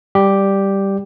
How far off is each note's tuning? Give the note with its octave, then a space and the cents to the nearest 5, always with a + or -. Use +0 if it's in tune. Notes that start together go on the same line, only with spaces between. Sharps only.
G3 +0 G4 +0